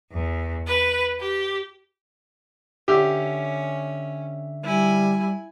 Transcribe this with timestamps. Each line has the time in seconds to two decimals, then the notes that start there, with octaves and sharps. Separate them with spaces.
0.12 E2
0.66 B4
1.20 G4
2.88 D3 C#4 G4 E5 F6
4.64 G3 E4 G#5